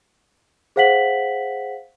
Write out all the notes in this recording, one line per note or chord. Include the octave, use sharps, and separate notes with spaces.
G#4 C5 F5 F#5 B6 F#7